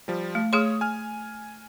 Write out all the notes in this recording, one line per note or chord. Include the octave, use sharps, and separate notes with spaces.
F3 G3
A3
A3 G#4 C#5 C6 D#6 F6
G#5 F6